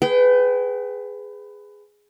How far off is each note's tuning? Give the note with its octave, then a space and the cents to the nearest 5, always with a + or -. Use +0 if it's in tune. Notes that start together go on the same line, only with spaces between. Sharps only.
G#4 +0 B4 +20 G5 -25